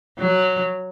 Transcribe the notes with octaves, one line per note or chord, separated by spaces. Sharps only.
F#3